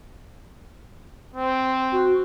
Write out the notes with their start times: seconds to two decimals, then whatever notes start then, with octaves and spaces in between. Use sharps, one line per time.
1.34 C4
1.92 F#4